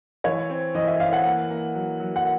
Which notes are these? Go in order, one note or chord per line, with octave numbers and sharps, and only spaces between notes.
E3 C#5
C4
E3 D#5
E5
E3 F5
F#5
A#3
A#3
F#3
F#3
F#5